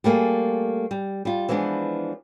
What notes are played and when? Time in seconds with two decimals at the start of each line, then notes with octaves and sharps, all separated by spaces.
0.04 G3 A3 A#3 G#4
0.91 G3
1.25 G3 F4
1.49 E3 F3 G#3 B3 D4